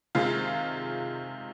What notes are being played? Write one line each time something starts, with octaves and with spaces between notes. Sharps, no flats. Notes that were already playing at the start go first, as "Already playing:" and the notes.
C3 D#3 G#3 F4